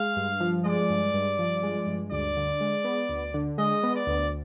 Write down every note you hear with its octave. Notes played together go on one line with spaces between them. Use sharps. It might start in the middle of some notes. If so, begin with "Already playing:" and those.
Already playing: G#3 F5
G2
F3
G#3 D5
G2
G2
F3
G#3
G2
D2 D5
D3
G#3
B3
D2
D3
G#3 D#5
B3
D5
D2